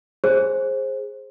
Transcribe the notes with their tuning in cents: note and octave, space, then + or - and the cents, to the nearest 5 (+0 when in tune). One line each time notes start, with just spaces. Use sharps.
G#4 +0 C5 +20